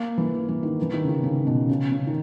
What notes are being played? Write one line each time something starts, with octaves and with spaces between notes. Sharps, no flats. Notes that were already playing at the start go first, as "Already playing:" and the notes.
Already playing: A#3
E3
E3
D#3
E3
D#3
C#3
D#3
C#3
B2
C#3
C#3
D#3